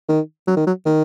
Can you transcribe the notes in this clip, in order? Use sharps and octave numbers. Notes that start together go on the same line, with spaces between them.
D#3
F#3
D#3
F#3
D#3